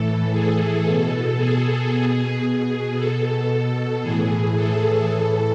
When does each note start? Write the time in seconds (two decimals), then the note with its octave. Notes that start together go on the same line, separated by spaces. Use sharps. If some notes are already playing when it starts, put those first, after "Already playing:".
Already playing: A2 E3 A4
0.32 G#4
0.85 B2 A4
1.38 G#4
1.91 B2
2.44 G#4
2.96 B2 A4
4.02 A2 E3 G#4
4.55 A4
5.08 A2 E3